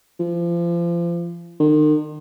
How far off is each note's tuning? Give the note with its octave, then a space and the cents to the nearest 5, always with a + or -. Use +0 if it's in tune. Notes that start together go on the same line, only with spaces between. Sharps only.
F3 -30
D#3 -40